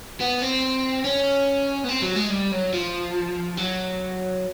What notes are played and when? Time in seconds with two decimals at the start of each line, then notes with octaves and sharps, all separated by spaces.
0.20 B3
0.42 C4
1.05 C#4
1.84 B3
1.89 C4
2.03 F#3
2.16 G#3
2.30 G3
2.52 F#3
2.73 F3
3.57 F#3